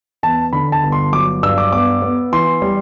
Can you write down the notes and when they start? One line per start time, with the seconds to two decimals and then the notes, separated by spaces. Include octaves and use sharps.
0.23 E2 A5
0.53 D3 B5
0.72 A5
0.83 G1
0.92 C6
1.12 F#3 D6
1.43 G2 E6
1.58 D6
1.72 B3 D6
2.02 B3
2.32 E3 C6
2.62 G3